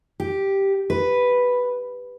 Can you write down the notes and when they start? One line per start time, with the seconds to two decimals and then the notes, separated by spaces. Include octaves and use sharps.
0.20 G4
0.90 B4